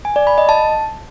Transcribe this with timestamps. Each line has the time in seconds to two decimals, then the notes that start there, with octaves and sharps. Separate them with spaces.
0.05 G#5
0.16 D5
0.27 B5
0.38 D#5
0.49 A5